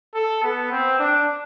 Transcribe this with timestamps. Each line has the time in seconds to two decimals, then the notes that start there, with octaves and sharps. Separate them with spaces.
0.15 A4
0.43 B3
0.71 C4
0.99 D4